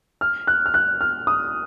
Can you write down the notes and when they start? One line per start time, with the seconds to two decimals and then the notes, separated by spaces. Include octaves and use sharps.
0.21 F6
0.47 F#6
0.66 F6
0.74 F#6
1.01 F6
1.27 D#6